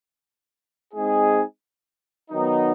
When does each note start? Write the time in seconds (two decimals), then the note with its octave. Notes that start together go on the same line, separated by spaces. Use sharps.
0.94 G#3 C4 D#4 G#4
2.31 D#3 F#3 B3 D#4